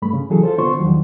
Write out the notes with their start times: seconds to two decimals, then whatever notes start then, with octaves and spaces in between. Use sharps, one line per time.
0.02 G2 A3 B5
0.13 C#3
0.30 E3 F#3 G#4 A4
0.43 F4 A4 C5
0.58 D3 B3 F4 C5 C6 C#6
0.79 E2 D3 D#3 F3 F#3